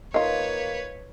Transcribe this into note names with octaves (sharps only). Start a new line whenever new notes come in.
D#3 A#3 F4 B4 C#5 D#5